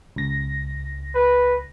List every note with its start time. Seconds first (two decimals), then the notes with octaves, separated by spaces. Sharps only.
0.16 C#2 A#6
1.15 B4